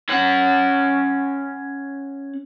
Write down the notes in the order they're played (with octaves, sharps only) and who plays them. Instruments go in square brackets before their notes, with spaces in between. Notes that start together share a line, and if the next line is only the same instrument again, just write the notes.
[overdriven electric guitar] C#4 F#5